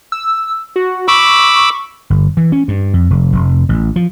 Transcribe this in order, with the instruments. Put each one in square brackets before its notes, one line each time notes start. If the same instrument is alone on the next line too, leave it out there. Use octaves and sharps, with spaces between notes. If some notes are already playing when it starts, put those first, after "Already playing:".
[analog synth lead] E6
F#4
[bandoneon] B5 D6 E6 [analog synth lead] C#6
[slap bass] G1
E3
C#4
G2
F2
F1
F1
A1
F3